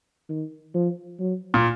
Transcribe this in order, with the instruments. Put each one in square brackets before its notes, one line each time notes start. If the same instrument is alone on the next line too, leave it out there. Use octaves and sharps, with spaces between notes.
[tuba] D#3
F3
F#3
[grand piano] A#2